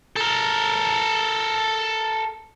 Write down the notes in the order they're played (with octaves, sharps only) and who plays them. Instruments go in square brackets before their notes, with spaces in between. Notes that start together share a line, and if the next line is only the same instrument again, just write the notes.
[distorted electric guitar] A4 A#4